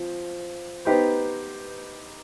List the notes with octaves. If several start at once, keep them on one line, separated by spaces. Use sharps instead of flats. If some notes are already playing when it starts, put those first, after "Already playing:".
Already playing: F3 C4
B3 D#4 G4 C5